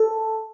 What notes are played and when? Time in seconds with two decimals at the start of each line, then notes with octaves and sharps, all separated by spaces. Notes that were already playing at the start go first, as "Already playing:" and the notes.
Already playing: A4